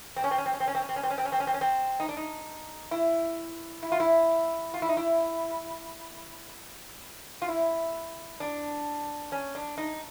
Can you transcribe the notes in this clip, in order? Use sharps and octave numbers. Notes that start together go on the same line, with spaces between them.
C4
C#4
C4
C#4
C4
C#4
C4
C#4
C4
C#4
C4
C#4
C4
C#4
C4
C#4
C4
C#4
C4
C#4
C4
D#4
D4
D#4
E4
E4
F4
E4
F4
E4
D#4
E4
F4
E4
D4
C#4
D4
D#4